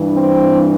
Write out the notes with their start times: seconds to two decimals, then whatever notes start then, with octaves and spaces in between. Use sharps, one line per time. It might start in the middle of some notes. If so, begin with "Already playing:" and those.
Already playing: G2 E3
0.13 C4